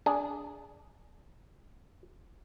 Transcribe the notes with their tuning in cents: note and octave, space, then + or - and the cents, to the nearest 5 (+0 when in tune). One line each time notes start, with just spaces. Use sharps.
D4 -15 G#4 +0